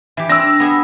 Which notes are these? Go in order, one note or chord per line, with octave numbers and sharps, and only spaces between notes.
E3 G4
C4 D4 E6 A#6
B3 G#4 E5